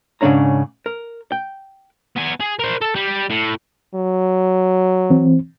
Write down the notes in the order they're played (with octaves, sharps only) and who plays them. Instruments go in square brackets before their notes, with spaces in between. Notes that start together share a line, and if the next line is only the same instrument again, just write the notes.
[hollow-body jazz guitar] G#2 C#3 G#3 D4 C#5 A#5
A#4
G5
[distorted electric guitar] B3 G#5
G#4
A#4 C5
A4
G3
A2
[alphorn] F#3
[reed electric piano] E3 C4